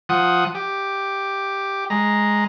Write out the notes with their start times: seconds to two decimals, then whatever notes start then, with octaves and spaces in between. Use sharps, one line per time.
0.09 F3 F#5 D#6
0.55 G4
1.90 G#3 A#5